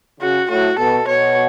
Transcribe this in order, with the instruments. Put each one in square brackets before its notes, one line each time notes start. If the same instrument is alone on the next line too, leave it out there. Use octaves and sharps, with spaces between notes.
[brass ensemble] C#3 [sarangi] F#4
[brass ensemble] A2 [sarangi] F#4
[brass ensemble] B2 [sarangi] A4
[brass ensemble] B2 [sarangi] C#5